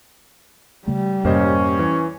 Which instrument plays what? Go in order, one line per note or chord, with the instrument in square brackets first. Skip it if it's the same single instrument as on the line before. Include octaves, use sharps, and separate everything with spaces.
[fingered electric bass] C#3 A3 [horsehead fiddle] G3
[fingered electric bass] F2 G#2 C3 [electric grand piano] A#3 C5 D#5 [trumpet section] C#4
[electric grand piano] E3